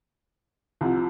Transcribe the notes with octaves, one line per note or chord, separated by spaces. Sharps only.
C2 C3 F3